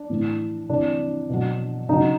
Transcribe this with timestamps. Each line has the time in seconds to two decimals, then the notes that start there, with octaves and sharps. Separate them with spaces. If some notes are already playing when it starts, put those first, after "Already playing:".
Already playing: D4
0.10 A2 E3
0.69 C3 E3 D4
1.29 B2 F#3
1.89 C#3 F#3 D#4